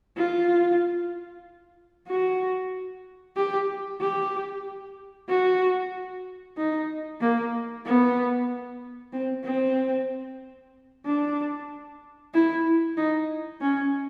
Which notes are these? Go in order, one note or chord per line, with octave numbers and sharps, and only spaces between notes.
F4
F#4
G4
G4
F#4
D#4
A#3
B3
C4
C4
D4
E4
D#4
C#4